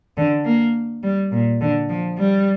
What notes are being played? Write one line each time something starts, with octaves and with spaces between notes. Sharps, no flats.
D3
A#3
G3
A#2
D3
F3
G3